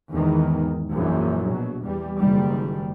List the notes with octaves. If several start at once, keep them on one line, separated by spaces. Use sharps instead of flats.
G#1 E2 D#3
A#1 F#2 E3
B2 F#3
E2 G3
F#1 G#2 D#3 G3